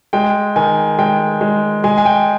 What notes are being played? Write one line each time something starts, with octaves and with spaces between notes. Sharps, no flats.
G#3 G5
D#3 G#5
G#3 G5
G#3
G#3 G#5
G#5
G5